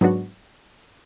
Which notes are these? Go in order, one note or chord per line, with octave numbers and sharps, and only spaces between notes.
G#2 F#3 B3 D4 F#4